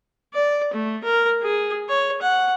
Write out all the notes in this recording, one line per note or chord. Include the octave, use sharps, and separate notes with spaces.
D5
A3
A#4
G#4
C#5
F#5